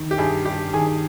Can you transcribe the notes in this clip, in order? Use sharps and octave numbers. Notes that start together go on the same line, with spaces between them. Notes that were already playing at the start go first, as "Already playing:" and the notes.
Already playing: D#3
G4
G2 G#4
G2 G4
D#3 G#4